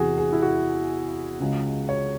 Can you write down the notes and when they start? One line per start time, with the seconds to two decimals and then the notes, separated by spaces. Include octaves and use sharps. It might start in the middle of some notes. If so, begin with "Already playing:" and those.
Already playing: E2 C3 E3 F#4 G#4
0.18 G#4
0.33 E4
0.42 F#4
1.40 C#2 C#3 G#3
1.89 C#5